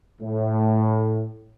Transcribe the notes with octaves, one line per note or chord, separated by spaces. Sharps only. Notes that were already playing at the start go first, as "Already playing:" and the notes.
A2